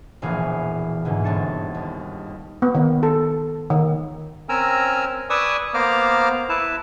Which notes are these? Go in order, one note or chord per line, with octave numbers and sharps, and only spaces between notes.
E1 A#1 E3 G#4 F5
E2 G#2 B2 D3
G1 C4 C#5 A5 A6 C#7
D#2
B3
D#3
A4
D#3
C4 C#4 A#4 G#5 A#5 E6
B4 D5 G#5 C#6 D#6 E6
A#3 B3 C5 A#5 D6 F6
E4 B4 A5